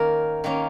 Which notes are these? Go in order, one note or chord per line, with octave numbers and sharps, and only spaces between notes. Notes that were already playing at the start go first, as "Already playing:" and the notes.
Already playing: D#3 A#3 C#4 A#4
D#3 A#3 C#4